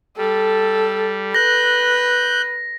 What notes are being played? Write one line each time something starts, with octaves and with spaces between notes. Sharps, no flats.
G3 A4
B4 F#6 G6 A#6